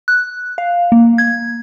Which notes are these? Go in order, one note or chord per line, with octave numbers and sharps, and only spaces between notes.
F#6
F5
A#3
G#6